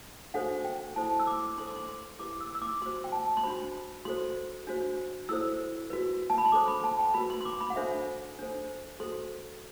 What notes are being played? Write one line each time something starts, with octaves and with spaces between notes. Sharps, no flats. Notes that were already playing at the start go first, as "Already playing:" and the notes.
D4 F#4 A4 C5 F#5
G5
E4 A4 C5 A5
E6
D6
D4 A4 C5 C6
D6
C6
E4 G4 B4 D6
E6
E6
D6
F#4 C5 C6
G5
A5
C6
D4 F#4 C5 B5
F#4 A4 C5 C6
D4 F#4 C5
E4 A4 C5 E6
F#4 B4
A5
B5
C6
D4 A4 C5 D6
B5
A5
G5
F#4 B4 B5
C6
C6
D6
B5
F#5
D4 F#4 A4 C5 E5
D4 A4 C5
F#4 A4 C5 C6